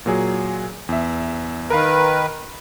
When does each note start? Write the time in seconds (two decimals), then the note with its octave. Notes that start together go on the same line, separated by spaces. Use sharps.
0.06 A#2 F#3 G#4
0.89 E2 E5
1.70 D#3 A#4 B4 F5